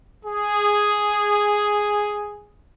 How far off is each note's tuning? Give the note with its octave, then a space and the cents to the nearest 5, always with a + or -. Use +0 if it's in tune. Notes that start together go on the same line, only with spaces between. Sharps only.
G#4 +0